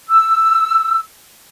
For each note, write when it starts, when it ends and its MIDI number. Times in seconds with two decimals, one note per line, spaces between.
0.09 1.00 88